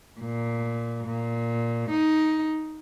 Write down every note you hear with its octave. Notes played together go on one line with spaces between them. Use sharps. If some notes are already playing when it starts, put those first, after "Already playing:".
A#2
A#2
D#4